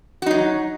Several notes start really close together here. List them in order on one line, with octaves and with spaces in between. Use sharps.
F#4 D#4 F#3